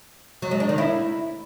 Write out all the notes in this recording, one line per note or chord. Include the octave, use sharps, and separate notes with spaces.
F#3
G#3
D4
D#3
E4